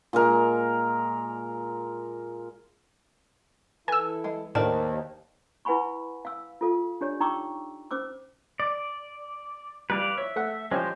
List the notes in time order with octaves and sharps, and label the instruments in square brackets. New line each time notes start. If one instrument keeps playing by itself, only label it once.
[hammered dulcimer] A#2 G#3 A#4
[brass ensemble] E3 E4 A4 [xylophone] B4 [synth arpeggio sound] G#5 E6
[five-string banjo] G#3
[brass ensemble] D#2 [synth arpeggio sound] A2 [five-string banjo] D4 A#4 D5 [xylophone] C5 D#5 A5
[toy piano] E4 B4 F#5 G#5 B5 C#6
F5 E6
F4 A4 F5
D4 G4 C#5 D5
D#4 G5 A#5 C#6 D6 E6
C#4 C5 D6 E6
[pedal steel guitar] D5
[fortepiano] G3 [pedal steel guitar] B4 D5 F5
[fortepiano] C#5 [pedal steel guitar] E5
[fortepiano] A3 F#5
[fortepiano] F3 C#4 G4 [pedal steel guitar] G#3 C5